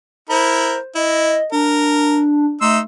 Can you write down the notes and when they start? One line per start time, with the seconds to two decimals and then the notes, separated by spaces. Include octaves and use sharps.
0.29 E4 A#4 C5 B5
0.95 E4 D#5
1.52 D4 A#4
2.61 A3 D#4 C6 E6